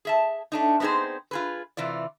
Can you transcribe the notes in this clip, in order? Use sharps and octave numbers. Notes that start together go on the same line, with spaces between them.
G#4 E5 A5
A3 D4 D#4
B3 C4 D#4 G#4 C5
F4 G#4 B4
C3 E3 F4 D5